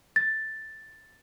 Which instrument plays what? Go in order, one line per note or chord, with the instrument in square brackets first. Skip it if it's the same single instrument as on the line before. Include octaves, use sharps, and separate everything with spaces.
[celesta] A6